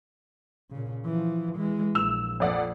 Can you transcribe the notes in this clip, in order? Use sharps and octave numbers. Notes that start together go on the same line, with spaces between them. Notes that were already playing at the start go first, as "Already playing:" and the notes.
A#2 C#3
E3 F3
E3 G#3
A#1 E6 F7
F2 D5 F#5